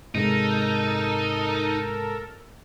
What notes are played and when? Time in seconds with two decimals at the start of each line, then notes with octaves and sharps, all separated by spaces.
0.15 G#2 C3 G#3 D#4 A4 A#4